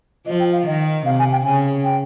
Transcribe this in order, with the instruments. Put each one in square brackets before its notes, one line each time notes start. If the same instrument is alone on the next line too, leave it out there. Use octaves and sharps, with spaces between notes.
[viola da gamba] F3 [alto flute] D#5
[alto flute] G5
F5
[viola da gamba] D#3 [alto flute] D#5
[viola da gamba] C3 [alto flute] F5
[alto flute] G#5
G5
[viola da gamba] C#3 [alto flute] G#5
[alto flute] G5